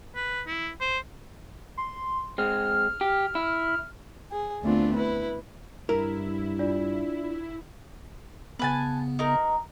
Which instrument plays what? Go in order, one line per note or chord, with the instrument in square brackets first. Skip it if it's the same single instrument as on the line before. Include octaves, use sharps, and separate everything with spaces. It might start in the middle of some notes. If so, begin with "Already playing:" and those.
[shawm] B4
E4
C5
[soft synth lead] C6
[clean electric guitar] G#3 C4 [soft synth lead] F6
[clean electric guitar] G4
E4
[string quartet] G#4
D2 A3 B3 C4 D4 F4
E4 B4
[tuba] G2 [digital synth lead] E4 [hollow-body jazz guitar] A#4
[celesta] D4 F4 D5
[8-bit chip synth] C#3 B3 [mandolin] B4 G#5 A5
[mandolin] D#4 A#4